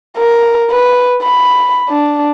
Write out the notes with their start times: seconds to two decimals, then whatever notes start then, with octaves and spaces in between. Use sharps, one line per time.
0.17 A#4
0.71 B4
1.22 B5
1.89 D4